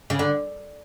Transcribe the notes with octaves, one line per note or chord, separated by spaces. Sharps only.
C#3
D3